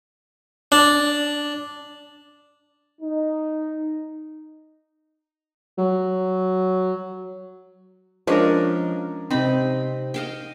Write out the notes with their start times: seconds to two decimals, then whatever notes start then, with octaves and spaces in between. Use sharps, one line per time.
0.72 D4
3.02 D#4
5.78 F#3
8.27 F3 G#3 C#4 D4 A#4
9.30 C3 C4 D#4 B5
10.14 D#5 F5 G5